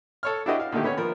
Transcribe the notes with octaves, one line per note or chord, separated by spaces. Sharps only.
A4 C#5 F6
D4 E4 F#4 G4 B4 D#5
F5
A#2 D3 D#3 A3 G4
B3 C#4 C#5
F3 A#4 B5